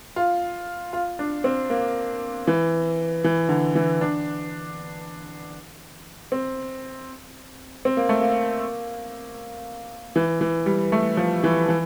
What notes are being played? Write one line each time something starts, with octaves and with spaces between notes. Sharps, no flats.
F4
F4
D4
C4
A#3
E3
E3
D3
E3
D4
C4
C4
A#3
A3
A#3
E3
E3
G3
A3
F3
E3
E3